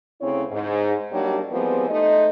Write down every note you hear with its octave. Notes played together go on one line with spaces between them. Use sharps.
D2 C#3 C4 E4 C#5
G#2
F#3 G3 A#3 D4 D#4 G4
E3 F3 G3 G#3 B3 C4
A3 D#4 C5 D#5